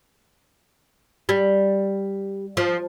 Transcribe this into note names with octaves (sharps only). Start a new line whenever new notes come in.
G3
F3